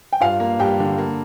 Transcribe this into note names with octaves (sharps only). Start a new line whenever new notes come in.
G5
G2 F4 F5
A#3
G2 G4 G5
D3
A#3